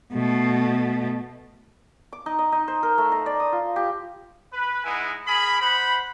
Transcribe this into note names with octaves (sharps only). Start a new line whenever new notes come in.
B2 A3
D6
D#4
D#5
D#4
C5
A#4
A3
A#5
D5
D#6
F4
G4
B4
G#3 D#4 E4 F#5 G#5
G#4 A#4 B5
C5 F#5 B5